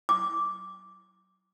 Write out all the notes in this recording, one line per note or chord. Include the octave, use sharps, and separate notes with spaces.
D6